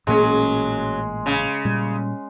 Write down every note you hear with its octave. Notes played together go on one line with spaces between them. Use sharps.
A1 A#2 F#3 G#3 A#3 C#4
C#3
A#2 G3